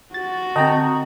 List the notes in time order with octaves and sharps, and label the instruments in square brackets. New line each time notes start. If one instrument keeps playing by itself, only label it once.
[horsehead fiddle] F#4 [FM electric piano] A6
[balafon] D3 C4 [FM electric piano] D#5 G5 A#5